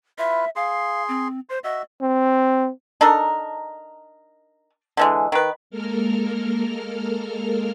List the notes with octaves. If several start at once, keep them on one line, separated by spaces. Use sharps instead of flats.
E4 F4 B4 E5
G#4 F5 C6
C4
C5 C6
F#4 D#5 E5
C4
D4 D#4 A4 A#4
D3 E3 G#3
D#3 B4
G#3 A#3 A4 A#4 F6